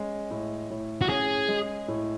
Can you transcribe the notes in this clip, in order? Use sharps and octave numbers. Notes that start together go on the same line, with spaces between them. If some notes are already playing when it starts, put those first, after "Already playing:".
Already playing: G#3 C#4
A2
A2
F#4
C#4 G#4
G#3
A2